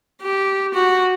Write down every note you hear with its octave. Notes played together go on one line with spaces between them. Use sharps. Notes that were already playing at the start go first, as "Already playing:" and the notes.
G4
F#4